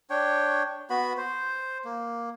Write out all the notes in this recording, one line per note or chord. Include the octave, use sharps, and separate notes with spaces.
D4 C#5 G5
B3 F#4 B5
C5
A#3